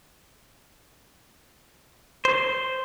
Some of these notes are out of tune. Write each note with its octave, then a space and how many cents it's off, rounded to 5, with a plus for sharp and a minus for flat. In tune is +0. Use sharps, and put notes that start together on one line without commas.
C5 -5